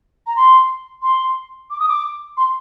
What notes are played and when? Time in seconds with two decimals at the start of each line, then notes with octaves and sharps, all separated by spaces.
0.26 A#5
0.36 C6
1.02 C6
1.70 D6
1.79 D#6
1.88 D6
2.37 C6